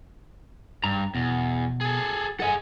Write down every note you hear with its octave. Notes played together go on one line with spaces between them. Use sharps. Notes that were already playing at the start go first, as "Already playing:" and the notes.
G2 A#5
E2 B2
G#4 A4
G#4 A4 D#5 F#5 G#5